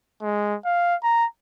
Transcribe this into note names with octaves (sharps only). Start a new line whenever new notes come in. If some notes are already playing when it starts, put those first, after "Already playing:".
G#3
F5
A#5